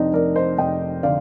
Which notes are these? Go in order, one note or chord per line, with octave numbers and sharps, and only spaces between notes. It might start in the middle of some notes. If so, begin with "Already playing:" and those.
Already playing: F1 C4 D4 D#4
F1 A#4 D5
C5 D#5
F1 D#5 G5
D3 D5 F5